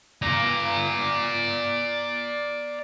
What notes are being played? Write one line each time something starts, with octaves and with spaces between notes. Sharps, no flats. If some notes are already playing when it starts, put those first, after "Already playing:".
D5 A#5